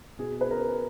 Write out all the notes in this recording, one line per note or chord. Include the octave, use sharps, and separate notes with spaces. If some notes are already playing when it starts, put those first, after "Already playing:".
B2 G#4
B4
A#4